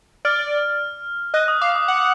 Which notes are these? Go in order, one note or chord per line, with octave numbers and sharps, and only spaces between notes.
D5 F6
D#5 F#6
D#6
F5 D6
D#6
F#5